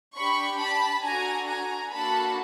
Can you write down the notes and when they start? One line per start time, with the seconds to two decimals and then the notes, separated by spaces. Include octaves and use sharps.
0.16 D4 G4 B5 C#6
0.61 A5 B5
1.04 D4 F#4 A4 G#5 A#5
1.48 G#5 A#5
1.92 A#3 D4 F#4 A4 A5 B5